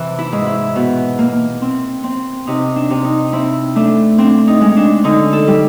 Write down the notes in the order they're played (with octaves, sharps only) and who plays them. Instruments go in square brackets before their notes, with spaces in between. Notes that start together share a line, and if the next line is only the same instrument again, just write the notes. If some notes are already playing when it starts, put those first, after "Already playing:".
Already playing: [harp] C3 E3
E4
G#2
E4
B2
A#3
C4
C4
C3 D#4
D4
C3
D#4
C4 E4
A3 D4
C4 D4
D#4
G#3
D4
D3 D#4
A4
G3